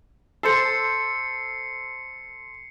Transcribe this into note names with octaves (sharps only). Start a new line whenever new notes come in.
A4 C5 C7 C#7